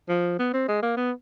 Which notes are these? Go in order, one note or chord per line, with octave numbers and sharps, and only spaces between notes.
F3
B3
C4
G#3
A#3
B3